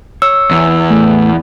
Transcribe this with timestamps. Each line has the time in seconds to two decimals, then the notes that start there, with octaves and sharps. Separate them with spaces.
0.22 C#5 E6
0.51 E2
0.90 A2 A3